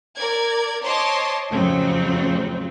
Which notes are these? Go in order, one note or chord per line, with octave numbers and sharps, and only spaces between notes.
A#4 D5 G#6
C5 C#5 D#5 A5 C6 D6
F2 A2 C#3 F#3 C4